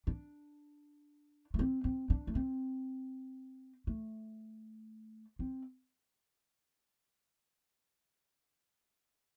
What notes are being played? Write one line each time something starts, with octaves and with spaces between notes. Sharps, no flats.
D4
A3
C4
C4
D4
A3
C4
A3
C4